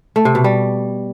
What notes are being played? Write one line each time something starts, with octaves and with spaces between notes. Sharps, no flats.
A3
C3
B2
G3